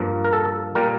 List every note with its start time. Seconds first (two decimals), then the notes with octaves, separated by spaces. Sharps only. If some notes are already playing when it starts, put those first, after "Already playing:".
Already playing: G2 F3 A#3
0.24 A#4
0.33 A4
0.75 A#2 G3 A#3 A#4